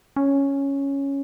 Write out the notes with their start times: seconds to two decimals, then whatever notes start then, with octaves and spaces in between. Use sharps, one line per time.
0.16 C#4